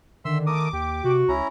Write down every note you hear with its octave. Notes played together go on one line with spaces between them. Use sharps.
D3 D#3 E5 C6 E6
A3 A#4 D6 D#6
D#2 G4
C3 F#4
C#2 C#4 E4 A#5